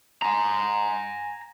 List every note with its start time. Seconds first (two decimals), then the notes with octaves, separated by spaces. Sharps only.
0.22 G#5 A#5